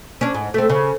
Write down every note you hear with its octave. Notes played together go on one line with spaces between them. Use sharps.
C#4 D4
G#2
A3 C4
C#3